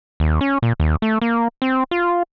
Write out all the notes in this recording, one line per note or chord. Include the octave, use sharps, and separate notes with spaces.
D#2
C#4
A#2
D#2
A3
A#3
C4
F4